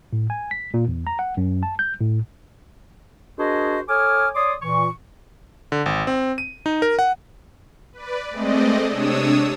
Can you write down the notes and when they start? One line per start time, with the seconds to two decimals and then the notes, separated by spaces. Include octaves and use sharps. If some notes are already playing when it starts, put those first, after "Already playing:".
0.13 A2
0.30 G#5
0.51 B6
0.74 A#2
0.88 E2
1.07 A#5
1.19 F#5
1.37 F#2
1.63 A5
1.79 G6
2.00 A2
3.39 D4 F#4 G#4 A#4 C5 D#5
3.89 A4 C#5 G#5 D6 D#6 F6
4.35 C#5 D5 C6 D6 D#6
4.62 A#2 E3 C#6
5.72 D3
5.86 G#1
6.07 C4
6.38 D#7
6.66 D#4
6.82 A#4
6.99 F#5
7.92 B4 D5
8.30 G#3 A3 C4 D5 D#5
8.90 C3 D4 C#5 D#6 E6